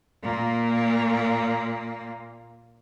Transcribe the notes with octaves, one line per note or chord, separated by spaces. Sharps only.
A#2 A#3